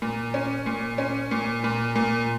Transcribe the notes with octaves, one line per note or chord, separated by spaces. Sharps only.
A#2
C#4
A#2
C#4
A#2
A#2
A#2